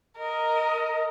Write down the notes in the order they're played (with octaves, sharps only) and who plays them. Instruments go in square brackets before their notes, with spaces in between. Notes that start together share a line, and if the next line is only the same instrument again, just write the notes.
[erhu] A#4 [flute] D#5